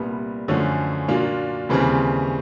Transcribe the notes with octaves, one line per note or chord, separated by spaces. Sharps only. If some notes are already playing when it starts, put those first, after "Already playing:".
Already playing: C2 A#2 G3 B3
F#2 D3 F3 A3 C#4
A#2 F#3 A#3 D4 F4
D#2 C#3 E3 G3 C4